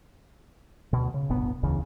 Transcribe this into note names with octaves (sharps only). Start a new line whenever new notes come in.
D2 B2
C#3
D1 G1 B2 B3
E1 D2 C#3 E3